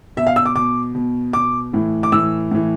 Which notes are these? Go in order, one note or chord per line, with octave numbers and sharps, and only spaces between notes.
B2 E5
F5
E6
D6
B2 D6
B2
B2 D6
A2 E3
D6
A2 E3 E6
A2 E3